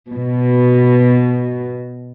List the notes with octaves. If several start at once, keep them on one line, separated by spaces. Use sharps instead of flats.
B2